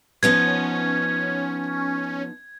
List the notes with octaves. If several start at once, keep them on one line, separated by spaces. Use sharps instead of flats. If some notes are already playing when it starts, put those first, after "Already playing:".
F3 B3 C#4 D#4 G#6